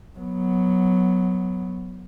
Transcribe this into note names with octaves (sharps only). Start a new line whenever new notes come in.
F#3 B3